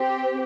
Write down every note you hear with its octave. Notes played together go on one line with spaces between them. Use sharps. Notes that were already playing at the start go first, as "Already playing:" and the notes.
Already playing: C4 G4